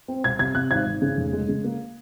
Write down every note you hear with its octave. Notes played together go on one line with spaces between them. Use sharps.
C4
C2 G#6
C3 G#6
C3 F#6
G#1 G#6
G#1
C#3
F1
G#3
C#3
A#3